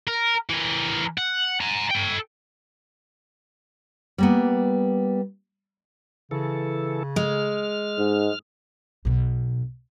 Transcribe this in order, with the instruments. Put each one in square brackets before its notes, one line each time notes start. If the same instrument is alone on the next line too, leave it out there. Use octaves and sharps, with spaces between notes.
[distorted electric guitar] A#4
E3 A#4
F#5
G#5 A#5
A4 G5
[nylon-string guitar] G3 A#3 B3
[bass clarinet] C#3 [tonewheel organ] E3 A4
[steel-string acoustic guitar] G#3 [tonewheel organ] F6
[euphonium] G#2
[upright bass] B1 B2